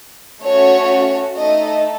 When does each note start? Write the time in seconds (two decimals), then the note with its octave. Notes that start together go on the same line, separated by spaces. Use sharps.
0.43 A3 C#4 F#4 C#5
1.37 A3 D#4 A4 D#5